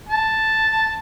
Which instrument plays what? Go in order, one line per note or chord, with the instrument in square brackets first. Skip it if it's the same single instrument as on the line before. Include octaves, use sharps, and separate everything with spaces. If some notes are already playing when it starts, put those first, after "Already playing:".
[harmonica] A5